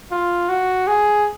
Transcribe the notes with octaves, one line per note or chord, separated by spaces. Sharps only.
F4
F#4
G#4